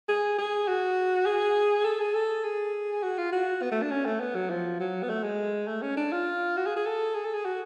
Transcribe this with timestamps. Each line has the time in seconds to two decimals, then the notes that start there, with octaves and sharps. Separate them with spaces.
0.08 G#4
0.38 G#4
0.68 F#4
1.26 G#4
1.85 A4
2.00 G#4
2.15 A4
2.44 G#4
3.03 F#4
3.18 F4
3.33 F#4
3.62 B3
3.72 A3
3.82 D4
3.91 C#4
4.06 A3
4.20 B3
4.35 F#3
4.50 F3
4.80 F#3
5.03 B3
5.10 A3
5.24 G#3
5.68 A3
5.82 C#4
5.97 D4
6.12 F4
6.57 F#4
6.66 G#4
6.77 G#4
6.86 A4
7.15 G#4
7.25 A4
7.34 G#4
7.45 F#4